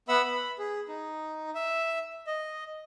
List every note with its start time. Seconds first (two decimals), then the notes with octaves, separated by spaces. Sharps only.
0.09 B3 B4 E5 F#5 B5 E6
0.25 B5
0.59 G#4
0.88 D#4
1.55 E5
2.27 D#5